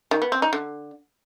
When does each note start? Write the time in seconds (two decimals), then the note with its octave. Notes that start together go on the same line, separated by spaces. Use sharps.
0.11 D#3
0.22 B3
0.32 C4
0.42 D#4
0.53 D3